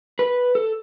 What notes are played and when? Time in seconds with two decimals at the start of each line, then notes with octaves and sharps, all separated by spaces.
0.19 B4
0.55 A4